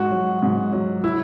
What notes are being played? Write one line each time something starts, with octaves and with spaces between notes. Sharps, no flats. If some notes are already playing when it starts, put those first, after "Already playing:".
Already playing: G#2 F#4
F#3
G#2
F#3
E4